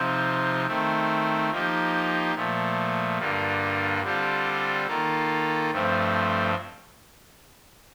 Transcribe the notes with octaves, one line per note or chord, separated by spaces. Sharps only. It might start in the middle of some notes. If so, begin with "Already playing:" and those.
Already playing: C3 F3 C4 D#4
D#3 A3 C4
F3 A#3 D#4 G4
A#2 F3 A3
G2 D3 G3 A#3 F4
D3 G3 C4 F4 A4
D#3 A#3 F4 A4
G2 F3 A3 C4